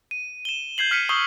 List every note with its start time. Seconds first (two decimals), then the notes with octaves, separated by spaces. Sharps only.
0.11 D#7
0.45 E7 G7
0.78 G6 G#6 C7 F#7
0.91 F6 B6 C#7 D#7
1.09 C#6 D#6 E6 G6 C7 G7